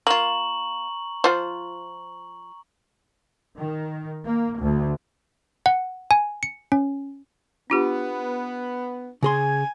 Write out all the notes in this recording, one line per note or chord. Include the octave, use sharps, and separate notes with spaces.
A#3 F4 A#5 C#6 F#7
F3 F4 C5
D#3
A#3
D2
F#5
G#5
C#7
C#4
B3 D4 F4 G4
C#3 G#4 G#5 C6